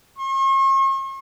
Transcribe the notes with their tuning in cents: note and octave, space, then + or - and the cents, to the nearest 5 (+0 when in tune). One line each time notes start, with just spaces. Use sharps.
C#6 -45